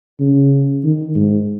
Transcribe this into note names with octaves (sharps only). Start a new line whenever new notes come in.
C#3
D#3
G#2